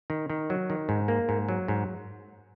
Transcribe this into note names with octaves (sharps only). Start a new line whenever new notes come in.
D#3
D#3
F#3
D#3
G#2
A#3
G#2
F#3
G#2